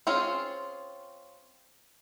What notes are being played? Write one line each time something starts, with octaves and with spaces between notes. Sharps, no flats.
C4 C#4 F4 G#4